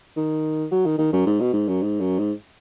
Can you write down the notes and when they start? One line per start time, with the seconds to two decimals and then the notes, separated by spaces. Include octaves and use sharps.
0.17 D#3
0.72 F#3
0.85 D#3
0.98 D#3
1.12 F#2
1.26 G#2
1.40 B2
1.53 G#2
1.68 F#2
1.82 G#2
2.00 F#2
2.19 G#2